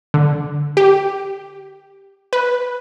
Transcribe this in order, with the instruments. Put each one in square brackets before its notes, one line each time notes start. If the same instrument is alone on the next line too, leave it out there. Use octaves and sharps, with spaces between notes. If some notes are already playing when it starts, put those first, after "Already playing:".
[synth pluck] D3
G4
B4